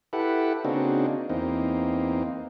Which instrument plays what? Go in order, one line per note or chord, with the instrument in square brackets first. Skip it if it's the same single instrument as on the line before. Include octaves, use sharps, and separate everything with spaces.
[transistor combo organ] E4 G4 A4 B4 F#5
C#3 A#3 C4 D4 D#4 F#4
E2 A#3 C4 D#4